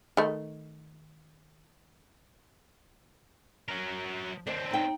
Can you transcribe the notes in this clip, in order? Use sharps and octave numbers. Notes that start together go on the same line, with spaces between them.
D#3 A3
F#3 A#4
D#2 C4 D4 C5 D#5
D#4 G5